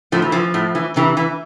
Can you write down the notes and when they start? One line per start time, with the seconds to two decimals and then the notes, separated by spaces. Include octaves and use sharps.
0.12 A2 F3
0.22 E3
0.32 E3 F3
0.54 A2
0.75 E3
0.96 C3 E3
1.17 E3